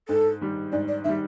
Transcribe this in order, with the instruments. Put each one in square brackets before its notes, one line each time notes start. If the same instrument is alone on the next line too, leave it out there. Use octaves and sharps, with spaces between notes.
[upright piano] G#2 [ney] A4
[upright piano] D#3 G3
[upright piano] G#2 [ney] D5
[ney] D5
[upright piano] D#3 G3 [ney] E5